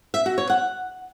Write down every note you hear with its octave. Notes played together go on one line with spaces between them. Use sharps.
E5
F#4
C#5
F#5